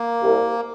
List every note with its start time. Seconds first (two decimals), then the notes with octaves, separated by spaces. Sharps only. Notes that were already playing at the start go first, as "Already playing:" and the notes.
Already playing: A#3
0.22 C2